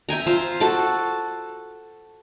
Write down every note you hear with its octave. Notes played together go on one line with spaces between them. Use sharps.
E5 G5 G#5 A#5
F4 C5 F5
F#4 A4 A5